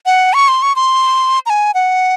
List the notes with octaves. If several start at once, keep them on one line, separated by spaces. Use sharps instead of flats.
F#5
C#6
C6
C#6
C6
A#5
G#5
F#5